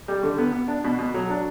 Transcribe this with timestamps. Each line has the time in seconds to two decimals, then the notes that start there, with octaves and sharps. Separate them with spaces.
0.08 G3
0.23 D3
0.38 B3
0.53 B3
0.68 D4
0.84 B2
0.99 B2
1.14 F#3
1.30 D4